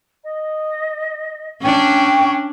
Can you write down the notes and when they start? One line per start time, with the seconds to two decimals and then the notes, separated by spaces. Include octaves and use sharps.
0.24 D#5
1.61 C#4 D4 G5 C#6